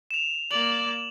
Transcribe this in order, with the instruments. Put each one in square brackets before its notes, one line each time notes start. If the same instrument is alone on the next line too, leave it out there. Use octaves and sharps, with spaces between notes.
[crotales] E7 F7
[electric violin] A#3 D5 [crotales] F#7